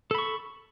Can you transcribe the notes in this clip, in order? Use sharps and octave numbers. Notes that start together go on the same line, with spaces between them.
A4 B5 C#6